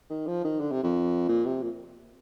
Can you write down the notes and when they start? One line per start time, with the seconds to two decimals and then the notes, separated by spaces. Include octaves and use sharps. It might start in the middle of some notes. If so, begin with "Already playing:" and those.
0.10 D#3
0.27 F3
0.44 D#3
0.60 D3
0.72 C3
0.83 F2
1.29 A#2
1.45 C3
1.62 A#2